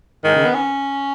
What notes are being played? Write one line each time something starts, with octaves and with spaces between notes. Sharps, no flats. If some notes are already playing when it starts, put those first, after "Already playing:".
G#2 D#3
C#3
B3
C#4